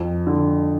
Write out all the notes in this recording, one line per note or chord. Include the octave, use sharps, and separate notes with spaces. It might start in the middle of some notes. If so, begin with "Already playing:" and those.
Already playing: F2
D3